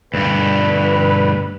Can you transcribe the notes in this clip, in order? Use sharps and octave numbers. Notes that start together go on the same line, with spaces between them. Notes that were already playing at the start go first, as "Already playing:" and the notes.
D2 G2 B4